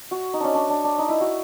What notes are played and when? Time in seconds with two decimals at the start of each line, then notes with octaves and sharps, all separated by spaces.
0.11 F#4
0.34 D#4
0.40 C#4 D4
0.55 D4
0.70 D4
0.84 D4
0.98 D#4
1.09 E4
1.21 F#4